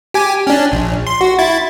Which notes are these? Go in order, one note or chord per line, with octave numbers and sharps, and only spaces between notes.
G4 G#5
C#4 D4
A#1
C6
F#4
E4 A6